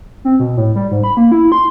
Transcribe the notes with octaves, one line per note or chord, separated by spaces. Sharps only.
C4
B2
A2
G3
G#2
B5
A#3
E4
C6